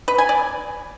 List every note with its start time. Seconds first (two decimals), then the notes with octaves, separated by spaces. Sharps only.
0.08 B4
0.18 G#5
0.29 D5